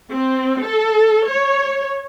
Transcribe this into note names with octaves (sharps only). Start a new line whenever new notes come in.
C4
A4
C#5